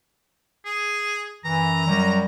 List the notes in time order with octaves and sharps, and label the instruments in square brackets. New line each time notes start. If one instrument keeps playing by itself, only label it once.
[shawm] G#4
[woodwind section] F#2 E3 [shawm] A#5
[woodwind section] F#2 F#3 G3